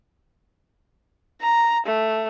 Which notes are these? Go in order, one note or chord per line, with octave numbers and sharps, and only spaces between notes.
A#5
A3